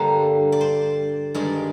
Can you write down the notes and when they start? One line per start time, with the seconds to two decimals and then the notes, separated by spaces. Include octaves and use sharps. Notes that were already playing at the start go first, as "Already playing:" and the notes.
Already playing: G2 D3 G3 A#3 C5
0.52 D5
0.61 C5
1.35 G2 D#3 G#3 D5